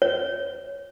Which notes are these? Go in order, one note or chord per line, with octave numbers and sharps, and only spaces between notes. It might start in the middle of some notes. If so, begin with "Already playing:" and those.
C#5